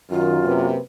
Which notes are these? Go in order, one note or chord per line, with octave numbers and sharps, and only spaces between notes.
F#2 D#3 F4
C3 A#3 B4